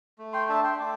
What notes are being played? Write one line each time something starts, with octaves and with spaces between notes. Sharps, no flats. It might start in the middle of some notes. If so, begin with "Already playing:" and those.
A3
G5 C6
D4 E5 A5
G5 C6
A3 A5 D6